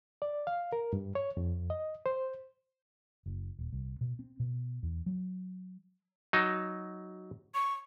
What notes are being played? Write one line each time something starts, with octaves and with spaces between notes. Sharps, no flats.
D5
F5
A#4
G2
C#5
F2
D#5
C5
F#1
D#1
C2
B2
C4
B2
E2
F#3
F#3 D#4
C#6